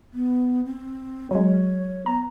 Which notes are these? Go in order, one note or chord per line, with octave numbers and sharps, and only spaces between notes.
B3
C4
F#3 G#3 C#5
B3 A#5